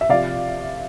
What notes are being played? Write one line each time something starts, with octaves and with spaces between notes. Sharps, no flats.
E5
C3 F3 D5 F5